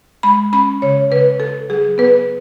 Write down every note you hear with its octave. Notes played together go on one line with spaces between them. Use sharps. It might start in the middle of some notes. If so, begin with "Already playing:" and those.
G#3 B5
C#4 B5
C#3 C#5
C#3 B4
C#3 A4
F#3 G#4
B3 B4